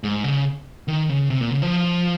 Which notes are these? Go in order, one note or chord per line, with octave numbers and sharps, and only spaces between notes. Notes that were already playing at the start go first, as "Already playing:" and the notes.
G#2
C#3
D#3
C#3
C3
A#2
C#3
F3